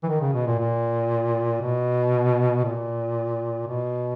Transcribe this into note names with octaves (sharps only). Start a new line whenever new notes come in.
E3
D#3
C#3
B2
A#2
A#2
B2
A#2
B2